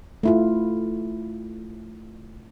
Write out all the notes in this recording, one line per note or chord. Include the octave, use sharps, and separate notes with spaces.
A3 E4 F4